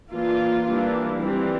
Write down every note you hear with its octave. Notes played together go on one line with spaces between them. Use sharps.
E3 A#3 D4 F4
E3 G3 A#3 D4
E3 G3 C4